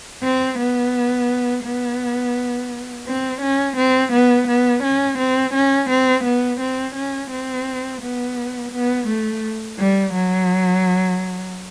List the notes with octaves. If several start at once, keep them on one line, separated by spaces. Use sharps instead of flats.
C4
B3
B3
C4
C#4
C4
B3
B3
C#4
C4
C#4
C4
B3
C4
C#4
C4
B3
B3
A3
G3
F#3